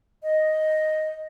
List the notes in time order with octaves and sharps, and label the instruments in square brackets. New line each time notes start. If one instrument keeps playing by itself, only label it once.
[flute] D#5